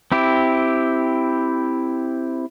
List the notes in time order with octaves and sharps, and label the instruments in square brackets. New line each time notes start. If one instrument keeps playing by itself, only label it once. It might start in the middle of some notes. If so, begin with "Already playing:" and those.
[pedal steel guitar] C4 E4 G4